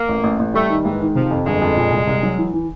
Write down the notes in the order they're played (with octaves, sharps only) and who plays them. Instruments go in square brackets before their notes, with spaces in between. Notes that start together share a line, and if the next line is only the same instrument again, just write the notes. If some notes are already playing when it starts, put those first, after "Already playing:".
Already playing: [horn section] A#3
[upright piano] A1
A1
A1
[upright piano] G3 [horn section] A3
[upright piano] D#3
[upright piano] G#2 [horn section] E3
[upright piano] D#3
[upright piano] C3 [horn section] F3
[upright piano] F2
[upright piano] G1 [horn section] G#3
[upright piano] F2
A#2
C2
C2
F#3
E3
E3